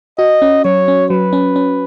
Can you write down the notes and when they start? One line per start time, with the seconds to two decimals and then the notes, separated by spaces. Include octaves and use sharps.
0.19 F#4 D#5
0.42 C#4
0.65 F#3 C#5
0.88 C#4
1.10 F#3 B4
1.33 C#4
1.56 C#4